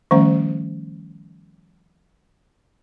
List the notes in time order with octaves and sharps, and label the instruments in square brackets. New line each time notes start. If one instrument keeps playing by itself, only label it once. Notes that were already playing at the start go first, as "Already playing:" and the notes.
[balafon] D#3 F3 G3 A3 C#4 C5